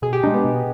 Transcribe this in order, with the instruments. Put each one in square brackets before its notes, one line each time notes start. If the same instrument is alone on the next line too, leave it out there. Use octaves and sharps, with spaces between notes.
[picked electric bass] B2 [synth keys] G#4
[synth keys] G4
[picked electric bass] G#3 D4 [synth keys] D#4
[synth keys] B3
[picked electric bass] B2